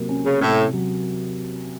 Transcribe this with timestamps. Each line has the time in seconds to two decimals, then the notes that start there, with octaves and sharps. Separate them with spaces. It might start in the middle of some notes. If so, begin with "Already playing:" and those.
Already playing: C3 F#3 A#3
0.09 C#4
0.25 C#3
0.41 A2 C3
0.73 F#3